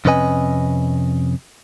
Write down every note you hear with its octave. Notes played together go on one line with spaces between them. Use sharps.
F2 C3 C#4 B4 D#5 G#5